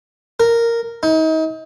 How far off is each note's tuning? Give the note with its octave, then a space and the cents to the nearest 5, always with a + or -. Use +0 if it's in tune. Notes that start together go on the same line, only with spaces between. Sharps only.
A#4 -5
D#4 +35